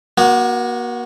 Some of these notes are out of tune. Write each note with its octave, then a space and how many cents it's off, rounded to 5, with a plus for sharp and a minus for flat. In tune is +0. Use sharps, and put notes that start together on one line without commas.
A#3 +40 F#4 +0